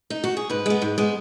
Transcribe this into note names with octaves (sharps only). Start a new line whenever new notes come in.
D#4
F#4
G#4
G#2 B4
G#3 B3
G#2
G#3 B3